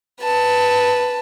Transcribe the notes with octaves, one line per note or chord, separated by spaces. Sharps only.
B4 A5